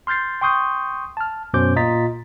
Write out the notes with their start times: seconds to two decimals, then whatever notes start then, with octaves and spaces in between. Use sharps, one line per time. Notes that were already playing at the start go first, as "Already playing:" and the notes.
0.07 C6 F6 G6 A6 C7
0.41 G5 C6 C#6 D#6 G6
1.17 A5 F6
1.54 F#2 B2 C#4 C5 D6 G6
1.76 A#2 F4 D#5 A#5 A6 B6